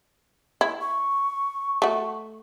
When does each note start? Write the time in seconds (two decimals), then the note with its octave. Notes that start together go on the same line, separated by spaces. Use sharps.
0.61 E4
0.81 C#6
1.82 A3 F#4